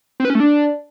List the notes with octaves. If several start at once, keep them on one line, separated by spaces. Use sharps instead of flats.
C4
B4
C#4
A3
D4